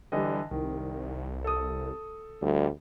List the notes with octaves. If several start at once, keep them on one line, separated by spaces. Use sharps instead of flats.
D3 E3 G3 D#5
C2 D#3
A4 D#6
D2 G3